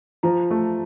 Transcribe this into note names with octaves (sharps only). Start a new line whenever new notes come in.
F3 A#5
A3